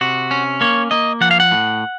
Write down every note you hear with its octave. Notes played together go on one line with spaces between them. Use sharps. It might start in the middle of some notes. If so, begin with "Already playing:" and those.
C3 F#4
C#4
A#3 C#5
A#3 D#5
F3 F#5
F5
F#5
A2